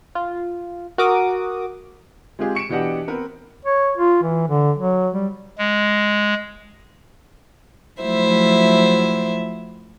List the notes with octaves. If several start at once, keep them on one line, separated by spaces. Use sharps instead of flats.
F4
F#4 A#4 D6 D#6
G#3 C4 F4 G4 G#4
C#6 C#7 D7 E7
B2 E3 D4 G4 D#5 F#5
B3 C4 A#4 B4
C#5
F4
E3
D3
F#3
G3
G#3
F3 F#3 A3 E4 C5 E5